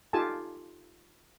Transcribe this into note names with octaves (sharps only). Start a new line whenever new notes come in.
D#4 F4 G4 A4 G#5 A5